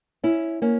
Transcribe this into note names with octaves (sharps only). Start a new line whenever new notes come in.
C#4 E4
A#3 C#4